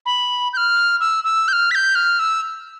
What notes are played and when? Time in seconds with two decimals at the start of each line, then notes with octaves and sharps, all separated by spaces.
0.06 B5
0.53 G6
0.57 F6
1.00 E6
1.24 E6
1.48 G6
1.53 F6
1.71 B6
1.75 G6
1.95 F6
2.19 E6